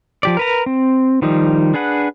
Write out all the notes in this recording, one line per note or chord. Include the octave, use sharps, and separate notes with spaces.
F3 G4 D5
A#4 B4 A#5
C4
D#3 F3 G3 D#4
D4 G#4 B4 F#5